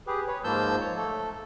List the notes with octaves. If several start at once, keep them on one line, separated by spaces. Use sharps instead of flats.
G4 G#4 B4
B4 C#5
G#2 F3 A#3 A5 E6 G6
C#5
A3 A4